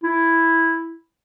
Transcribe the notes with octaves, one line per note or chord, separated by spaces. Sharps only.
E4